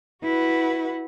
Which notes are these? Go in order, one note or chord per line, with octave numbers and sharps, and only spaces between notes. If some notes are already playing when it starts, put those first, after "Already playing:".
E4 F#4 B4 F#5